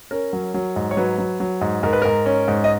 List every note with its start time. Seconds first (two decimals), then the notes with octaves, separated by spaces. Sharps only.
0.11 C#4 A#4
0.33 F#3
0.54 F#3
0.76 G#2
0.91 C#5
0.97 F#3 B4
1.18 F#3
1.40 F#3
1.61 G#2
1.83 G#2 A#4
1.93 B4
2.02 G#2 A#4
2.26 C#4
2.48 G#2
2.64 D#5